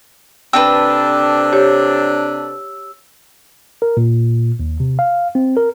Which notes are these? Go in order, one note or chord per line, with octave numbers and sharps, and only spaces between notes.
C3 C4 D4 A4 B4 E6
G4 C#5
A#4
A#2
D#2
C3
F5
C4
A#4